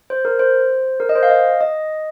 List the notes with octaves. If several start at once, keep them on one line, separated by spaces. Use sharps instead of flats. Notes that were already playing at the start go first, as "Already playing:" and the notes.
C5
A#4
C5
A#4
D#5
C5
F5
D#5
D#5